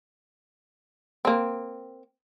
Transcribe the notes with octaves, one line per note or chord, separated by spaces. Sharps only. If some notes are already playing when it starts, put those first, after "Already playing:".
A#3 C4